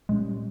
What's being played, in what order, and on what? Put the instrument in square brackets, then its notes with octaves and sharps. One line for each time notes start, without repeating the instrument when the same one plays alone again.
[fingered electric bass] A#2 G3 C#4 [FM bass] G#3